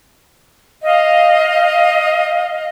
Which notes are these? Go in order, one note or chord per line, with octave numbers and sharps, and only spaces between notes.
D#5 F5